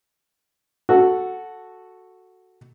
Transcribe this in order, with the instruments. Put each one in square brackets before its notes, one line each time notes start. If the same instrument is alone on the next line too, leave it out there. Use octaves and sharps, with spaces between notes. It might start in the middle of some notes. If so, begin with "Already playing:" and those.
[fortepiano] F#4 A4